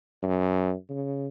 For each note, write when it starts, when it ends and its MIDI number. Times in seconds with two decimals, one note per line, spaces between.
0.23 0.74 42
0.89 1.28 49